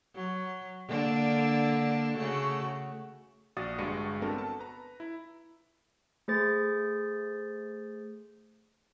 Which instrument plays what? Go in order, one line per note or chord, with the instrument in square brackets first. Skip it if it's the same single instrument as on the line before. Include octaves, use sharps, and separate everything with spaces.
[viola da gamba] F#3
D3 A#3 D4
C#3 A3 F#4
[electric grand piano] A#1 F#4 D5 F5 D#6 A6
G1 G2 G#3 F#4 C#7 D#7
B3 C4 D4 F#4 A4 A#4
A5
B4 A#5
E4
[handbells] A3 G#4 C5 A6